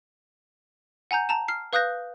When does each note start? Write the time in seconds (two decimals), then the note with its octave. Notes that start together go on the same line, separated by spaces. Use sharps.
1.11 F#5 G#5 A#5 G6
1.29 A5 A#5 E7
1.48 F6 C7
1.73 B4 F5 D#6 F#6 G6 A#6